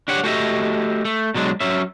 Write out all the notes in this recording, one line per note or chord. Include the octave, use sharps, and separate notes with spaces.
D4 G4 C#5 F#5
A3 F#4 G4 B4 D#5 E5
A3
B2 F#3 G#3 D4
F#3 C#4 E5